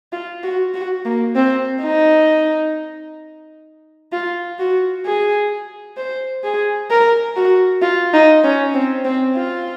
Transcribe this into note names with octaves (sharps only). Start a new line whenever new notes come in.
F4
F#4
F#4
A#3
C4
D#4
F4
F#4
G#4
C5
G#4
A#4
F#4
F4
D#4
C#4
C4
C4
F4